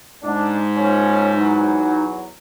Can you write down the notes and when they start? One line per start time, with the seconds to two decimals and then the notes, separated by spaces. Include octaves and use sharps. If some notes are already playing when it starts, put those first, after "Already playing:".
0.23 G#2 D4
0.76 D#2 F3 C#4 C#5
1.35 E2 F#3 D#4